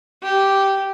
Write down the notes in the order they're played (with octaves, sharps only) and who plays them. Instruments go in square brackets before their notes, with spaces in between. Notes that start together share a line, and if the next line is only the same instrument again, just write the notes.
[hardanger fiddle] G4